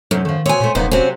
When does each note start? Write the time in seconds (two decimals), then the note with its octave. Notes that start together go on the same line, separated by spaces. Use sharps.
0.11 F#2 C3 F#3 A3 D#4
0.25 D#3 F3 A3
0.46 B2 C4 C#5 G#5
0.60 A#2 A3 C4 C#4
0.75 D#1 F#2 C3 A#3 B3 D#4
0.91 C3 F#3 C4 C#4